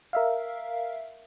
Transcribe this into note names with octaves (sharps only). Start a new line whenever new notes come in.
A#4 E5 F5